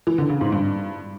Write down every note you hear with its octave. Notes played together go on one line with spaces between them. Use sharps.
E3
D3
C#3
G#2
G2